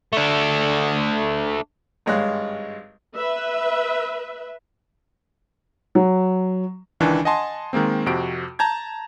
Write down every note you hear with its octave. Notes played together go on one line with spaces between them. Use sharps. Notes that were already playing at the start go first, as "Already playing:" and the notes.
A3 D4
G#1 G2 G#3 C#5 F5 F#6
B4 E5
F#3
C#2 D#3 E3 D4 G#5
D#5 F#5 G#5 A5 C6
D#3 G#3 A#3 C4
F2 C3 F#4 D7
A5 A#5 G6 G#6